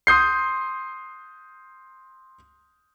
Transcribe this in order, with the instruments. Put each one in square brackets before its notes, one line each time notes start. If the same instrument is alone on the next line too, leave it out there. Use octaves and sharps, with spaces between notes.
[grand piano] C6 D#6 G6 C7